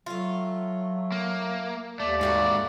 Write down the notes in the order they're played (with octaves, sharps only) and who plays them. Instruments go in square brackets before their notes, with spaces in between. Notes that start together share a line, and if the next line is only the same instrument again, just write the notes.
[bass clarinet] F#3 [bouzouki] A3 F4
[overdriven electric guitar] A#3
[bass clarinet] D#2 [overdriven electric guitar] A3 [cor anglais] D5
[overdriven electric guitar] G#2 F#4 [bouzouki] A3 G4 F5